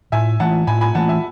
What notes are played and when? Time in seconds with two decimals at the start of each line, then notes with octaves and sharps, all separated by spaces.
0.12 A2 E5 G#5
0.40 E3 A3 F#5 A5
0.67 A2 G#5 B5
0.81 G#5 B5
0.95 E3 A3 F#5 A5
1.09 E5 G#5